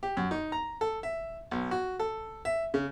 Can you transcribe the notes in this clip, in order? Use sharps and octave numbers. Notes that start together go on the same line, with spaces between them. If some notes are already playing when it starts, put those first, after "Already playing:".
G4
F#2
D#4
A#5
A4
E5
B1
F#4
A4
E5
C#3